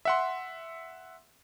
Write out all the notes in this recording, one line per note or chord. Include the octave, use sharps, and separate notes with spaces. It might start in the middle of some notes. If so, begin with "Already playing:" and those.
E5 F#5 C6